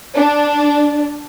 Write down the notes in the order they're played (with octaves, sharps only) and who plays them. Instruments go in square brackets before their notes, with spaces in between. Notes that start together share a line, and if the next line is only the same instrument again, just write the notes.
[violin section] D4